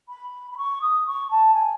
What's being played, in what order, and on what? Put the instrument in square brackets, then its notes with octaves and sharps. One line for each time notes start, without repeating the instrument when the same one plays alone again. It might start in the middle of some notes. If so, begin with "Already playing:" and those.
[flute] B5
B5
C#6
D#6
C#6
A5
G#5